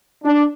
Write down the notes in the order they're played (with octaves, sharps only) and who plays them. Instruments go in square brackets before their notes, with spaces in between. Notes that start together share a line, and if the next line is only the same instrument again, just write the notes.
[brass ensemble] D4